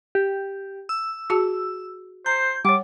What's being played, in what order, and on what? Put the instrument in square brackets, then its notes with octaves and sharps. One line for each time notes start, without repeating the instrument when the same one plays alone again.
[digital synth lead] G4
E6
[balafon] F#4 G#4 A5
[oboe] C5 [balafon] A#5 [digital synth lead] G6
[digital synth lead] G3 [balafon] C#5 F#5 [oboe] D6